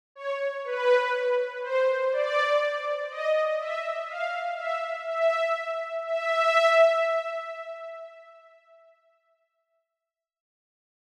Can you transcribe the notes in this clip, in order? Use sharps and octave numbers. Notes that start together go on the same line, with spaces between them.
C#5
B4
C5
D5
D#5
E5
F5
E5
E5
E5